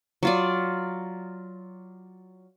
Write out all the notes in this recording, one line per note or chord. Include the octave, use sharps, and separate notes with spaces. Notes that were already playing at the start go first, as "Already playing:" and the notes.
F#3 F4 D5